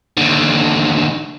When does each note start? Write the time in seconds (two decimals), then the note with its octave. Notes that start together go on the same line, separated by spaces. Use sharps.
0.17 D#2 D3